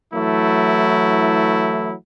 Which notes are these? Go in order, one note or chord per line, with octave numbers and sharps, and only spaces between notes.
E3 F#3 A3 E4